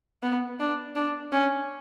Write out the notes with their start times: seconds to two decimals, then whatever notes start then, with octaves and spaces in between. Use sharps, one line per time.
0.23 B3
0.60 D4
0.96 D4
1.32 C#4